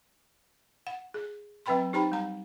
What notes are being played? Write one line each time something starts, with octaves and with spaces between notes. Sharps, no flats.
F#5
G#4
F#3 C4 B4 G5 B5 C6
D#4 G4 C5 G5 A#5 B5
G3 A#5